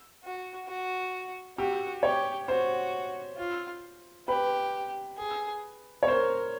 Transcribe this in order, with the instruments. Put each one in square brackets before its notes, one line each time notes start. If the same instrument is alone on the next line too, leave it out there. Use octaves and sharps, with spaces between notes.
[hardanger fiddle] F#4
F#4
[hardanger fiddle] F#4 [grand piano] G4
[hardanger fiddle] G4 [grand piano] C#5
[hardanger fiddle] F#4 [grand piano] C5
[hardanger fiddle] F4
[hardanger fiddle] G4 [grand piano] B4
[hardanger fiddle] G#4
[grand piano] C#5
[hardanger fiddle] A#4 [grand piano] C5